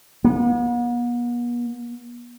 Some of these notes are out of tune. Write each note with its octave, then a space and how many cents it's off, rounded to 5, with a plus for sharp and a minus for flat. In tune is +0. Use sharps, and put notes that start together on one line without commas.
B3 -45